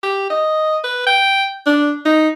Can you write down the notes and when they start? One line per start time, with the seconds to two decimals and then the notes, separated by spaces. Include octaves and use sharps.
0.03 G4
0.30 D#5
0.84 B4
1.07 G5
1.66 D4
2.05 D#4